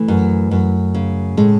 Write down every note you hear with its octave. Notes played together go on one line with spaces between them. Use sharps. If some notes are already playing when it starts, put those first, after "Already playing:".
Already playing: E3 A3
F#2
F#2
C#3
A2 G#3